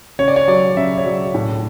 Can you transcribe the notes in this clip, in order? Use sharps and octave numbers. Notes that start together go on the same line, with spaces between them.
C#3 C#5
D5
C#5
F#3 D5
C#3 E5
C#5
F#3 D5
A2